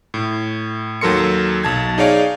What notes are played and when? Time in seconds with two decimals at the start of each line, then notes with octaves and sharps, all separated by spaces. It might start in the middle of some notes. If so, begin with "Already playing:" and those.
0.14 A2
1.01 D#2 F#3 A4 A#4 C6 C#7
1.63 B1 A5 G#6
1.98 D#4 G#4 C#5 D5 F5